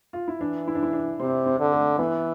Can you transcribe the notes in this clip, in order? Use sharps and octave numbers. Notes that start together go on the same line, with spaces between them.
F4
E4
E3 D4
E4
D4
E4
D4
C3 C4
C4
D3
A3
E3 B3